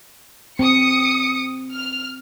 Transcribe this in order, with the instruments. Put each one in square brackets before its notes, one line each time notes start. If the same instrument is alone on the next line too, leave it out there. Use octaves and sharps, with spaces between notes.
[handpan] C4 [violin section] D#6 C#7
[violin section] F6